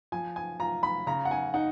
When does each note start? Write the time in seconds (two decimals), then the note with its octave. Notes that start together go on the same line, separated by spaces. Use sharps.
0.12 F3 G#5
0.36 G#5
0.60 F4 A#5
0.83 B5
1.07 C#3 A#5
1.25 F#5
1.31 G#5
1.54 D#4 F#5